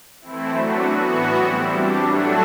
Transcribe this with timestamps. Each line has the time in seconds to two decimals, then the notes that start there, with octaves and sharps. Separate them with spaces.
0.21 E3 A3 C4 E4
0.50 F#3 A3 D4 F#4
0.80 E3 B3 F#4
1.09 A2 E3 B3 F#4
1.39 G3 C4 E4
1.68 G3 D4 G4
1.98 F#3 A3 D4 F#4 A4